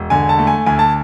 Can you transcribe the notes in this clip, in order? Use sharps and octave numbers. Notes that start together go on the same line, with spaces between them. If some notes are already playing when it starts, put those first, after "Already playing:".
Already playing: E1
D3 G#5
A5
A3
G#5
D2 G#5
A5